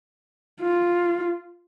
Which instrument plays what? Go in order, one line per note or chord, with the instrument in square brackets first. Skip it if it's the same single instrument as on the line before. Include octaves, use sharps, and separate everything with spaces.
[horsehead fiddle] F4